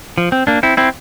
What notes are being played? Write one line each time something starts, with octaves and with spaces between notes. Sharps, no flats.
F3
C4
A#3 D4
C4 E4
C4 E4